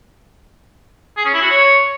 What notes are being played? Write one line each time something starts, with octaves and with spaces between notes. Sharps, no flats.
G#4
C#4
E4
F#4
C#5